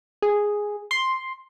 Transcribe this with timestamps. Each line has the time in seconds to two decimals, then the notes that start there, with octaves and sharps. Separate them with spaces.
0.22 G#4
0.91 C6